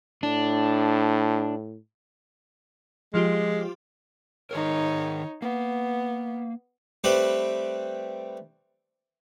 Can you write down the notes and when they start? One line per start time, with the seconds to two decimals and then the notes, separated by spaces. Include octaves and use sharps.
0.23 A2 D4
3.14 F3 G#3 F4 G4
4.51 D#3 D#4 G#4 A#4 C#5
5.42 A#3 B3
7.04 G3 A3 C4 G4 B4 G5